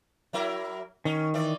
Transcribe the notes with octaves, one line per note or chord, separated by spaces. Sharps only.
F#3 E4 A#4
D#3 C#4
E3 D5